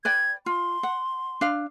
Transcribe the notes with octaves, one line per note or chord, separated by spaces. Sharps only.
B4 D5 G5 G#6
F4 C6
F#5
D4 F5